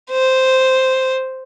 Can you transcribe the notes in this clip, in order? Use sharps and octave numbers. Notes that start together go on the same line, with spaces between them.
C5